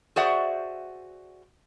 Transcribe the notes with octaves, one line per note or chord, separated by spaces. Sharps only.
F#4 G#4 C5 D5 E5 F#5